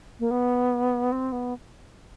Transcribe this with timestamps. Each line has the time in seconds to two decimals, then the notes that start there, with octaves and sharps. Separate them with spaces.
0.20 A#3
0.31 B3
1.12 C4
1.32 B3